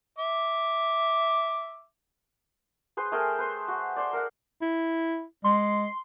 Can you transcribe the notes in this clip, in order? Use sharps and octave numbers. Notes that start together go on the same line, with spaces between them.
E5 D6
G#4 B4 C5
A3 G#4 A#4 G5
B4 C5
F#4
C5 D5
A#4 F#5
E4
G#3 C6